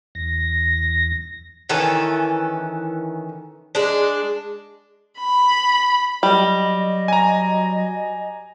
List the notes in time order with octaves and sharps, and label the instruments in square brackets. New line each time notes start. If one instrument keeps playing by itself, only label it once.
[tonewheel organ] E2 A#6
[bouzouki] D#3 E3 C#4 A4
G#3 D4
[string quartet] B5
[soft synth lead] F#3 [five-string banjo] G3 [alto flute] D#5
[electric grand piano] G#5 A#5